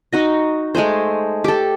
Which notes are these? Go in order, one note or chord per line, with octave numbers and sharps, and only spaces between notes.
D#4 F#4 D#5
G#3 A3 G#4 C5
G4 A4